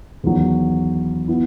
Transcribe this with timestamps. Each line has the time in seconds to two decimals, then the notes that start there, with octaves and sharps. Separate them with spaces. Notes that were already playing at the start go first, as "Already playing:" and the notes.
0.23 E2 D#3 F#3
1.28 B3 E4